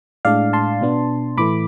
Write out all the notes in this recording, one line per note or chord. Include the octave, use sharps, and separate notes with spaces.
A2 G#3 D4 D5 F5
A5 C6
B2 B3 D4
A2 E3 A3 B5 D6